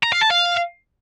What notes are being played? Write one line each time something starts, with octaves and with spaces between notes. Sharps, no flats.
A#5
F5
A5
F5